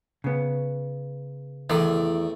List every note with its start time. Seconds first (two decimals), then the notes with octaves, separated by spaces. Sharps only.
0.24 C#3 B3
1.70 E2 D#3 A3 D5